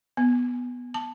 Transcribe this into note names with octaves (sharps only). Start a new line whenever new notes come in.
B3
A5